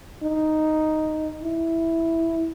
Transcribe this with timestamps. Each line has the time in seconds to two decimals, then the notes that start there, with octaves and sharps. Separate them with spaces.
0.22 D#4
1.42 E4